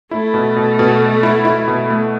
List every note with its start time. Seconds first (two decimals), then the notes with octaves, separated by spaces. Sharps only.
0.11 A3 E4
0.34 B2
0.56 B2
0.79 B2
1.01 B2
1.23 E4
1.45 E4
1.68 B2
1.90 A3